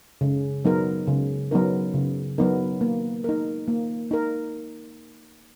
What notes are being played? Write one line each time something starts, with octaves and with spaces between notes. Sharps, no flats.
C#3
F#3 B3 D#4 A#4
C#3
F#3 B3 D#4 A#4
C#3
F#3 B3 D#4 A#4
A#3
D#4 A#4
A#3
D#4 A#4